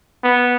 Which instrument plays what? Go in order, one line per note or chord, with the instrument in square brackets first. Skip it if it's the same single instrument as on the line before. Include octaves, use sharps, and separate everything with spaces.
[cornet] B3